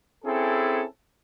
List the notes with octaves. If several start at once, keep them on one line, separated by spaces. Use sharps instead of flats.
C4 C#4 E4 G#4 A4